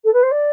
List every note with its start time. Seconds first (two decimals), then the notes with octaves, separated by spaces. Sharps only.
0.04 A4
0.13 B4
0.22 C5
0.31 D5